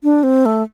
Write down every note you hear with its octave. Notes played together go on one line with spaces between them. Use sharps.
D4
C4
A3